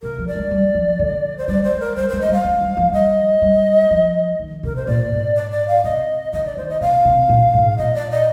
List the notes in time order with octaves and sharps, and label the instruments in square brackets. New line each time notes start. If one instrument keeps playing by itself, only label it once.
[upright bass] C3 [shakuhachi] A#4
[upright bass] F3
[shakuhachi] D5
[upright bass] G#3
G3
F3
D3
[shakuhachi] C5
[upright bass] G3 [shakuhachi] D5
[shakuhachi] C5
[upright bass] G#3
[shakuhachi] A#4
[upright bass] G3 [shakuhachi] C5
[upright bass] G#3 [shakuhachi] C5
[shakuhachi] D#5
[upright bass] G3 [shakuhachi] F5
[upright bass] G#3
G3
F3
[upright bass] G3 [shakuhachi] D#5
[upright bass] G3
F3
D#3
[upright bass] C3 [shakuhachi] A#4
[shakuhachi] C5
[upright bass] A#2 [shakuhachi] D5
[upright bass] G#2
[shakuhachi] D5
D5
F5
[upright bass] C3 [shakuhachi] D#5
[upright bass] D3 [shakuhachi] D#5
[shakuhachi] D5
[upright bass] D#3 [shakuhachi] C5
[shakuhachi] D#5
[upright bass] C3 [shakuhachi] F5
[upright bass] C3
A#2
G#2
[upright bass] A#2 [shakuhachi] D#5
[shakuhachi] D5
D#5